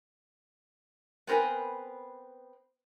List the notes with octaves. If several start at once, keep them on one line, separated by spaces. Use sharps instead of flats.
B3 C4 A#4 B4 G#5